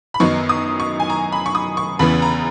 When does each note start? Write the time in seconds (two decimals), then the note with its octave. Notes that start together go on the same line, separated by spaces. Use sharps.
0.14 B5
0.20 F#2 D#3 F#3 B3 D#4 C#6
0.49 D#6
0.80 C#6
1.00 G#5
1.10 A#5
1.32 B5
1.46 C#6
1.55 D#6
1.77 C#6
1.99 E2 C#3 E3 B3 B5
2.22 A#5